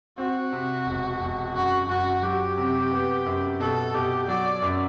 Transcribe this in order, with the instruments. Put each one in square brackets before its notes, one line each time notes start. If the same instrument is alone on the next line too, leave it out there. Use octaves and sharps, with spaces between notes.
[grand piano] C4 [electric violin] F#4
[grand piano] C3
E1
E1
[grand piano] F#2 [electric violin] F#4
[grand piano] F#2 [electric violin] F#4
[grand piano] F#3 [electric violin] G4
[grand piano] C3
B3
F#2
[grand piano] B2 [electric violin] A4
[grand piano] B2 [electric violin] G4
[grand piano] F#3 [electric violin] D5
[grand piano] F#2